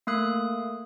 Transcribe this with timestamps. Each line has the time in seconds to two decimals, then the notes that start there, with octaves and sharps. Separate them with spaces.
0.07 A3 A#3 D#6 F#6